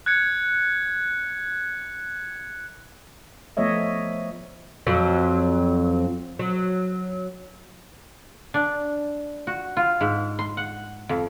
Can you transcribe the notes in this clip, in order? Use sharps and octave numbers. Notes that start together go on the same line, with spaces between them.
F#6 G#6 C#7
F3 A3 B3 C#5 D#5 E5
F2 F#3
F#3
D4
F#4
F4
G#2
C6
F#5
F2